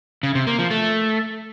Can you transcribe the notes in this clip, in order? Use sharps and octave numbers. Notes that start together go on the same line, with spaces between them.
C#3
C3
A#3
F3
A3